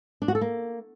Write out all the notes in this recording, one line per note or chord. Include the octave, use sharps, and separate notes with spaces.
D4
F#4
A4
A#3